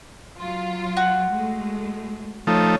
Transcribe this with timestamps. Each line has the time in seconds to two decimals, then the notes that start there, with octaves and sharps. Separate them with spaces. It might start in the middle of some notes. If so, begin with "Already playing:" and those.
0.39 F#3 F4
0.97 F#4
1.31 G#3 A3
2.47 F3 A3 D#4 C#5